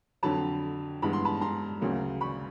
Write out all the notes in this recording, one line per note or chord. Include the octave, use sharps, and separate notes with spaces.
F2 D3 F#3 A5 B5
G2 E3 G#3 B3 B5
C6
A5 B5
A#5 C6
D2 C#3 F#3 A#3
B5 C#6